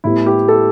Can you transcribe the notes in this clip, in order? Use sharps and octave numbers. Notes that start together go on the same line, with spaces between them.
A2 G3 B3 E4
G4
A4